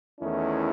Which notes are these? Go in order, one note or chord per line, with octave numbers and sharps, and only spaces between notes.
E2 D#3 A3 C#4 E4